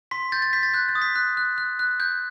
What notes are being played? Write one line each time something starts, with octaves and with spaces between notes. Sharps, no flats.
C6 B6
G6 A6
A6
G6 B6
A6
F#6 G6
A6
D#6
B6
F#6
F#6
F#6
F#6
F#6 G6